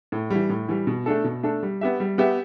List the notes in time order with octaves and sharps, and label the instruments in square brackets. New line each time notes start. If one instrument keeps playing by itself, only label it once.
[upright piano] A2
E3 G3
A2
E3 G3
B2
A3 D4 A4
B2
A3 D4 A4
G3
B3 G4 E5
G3
B3 G4 E5